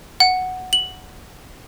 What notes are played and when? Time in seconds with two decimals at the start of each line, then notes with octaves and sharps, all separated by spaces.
0.20 F#5
0.73 F#7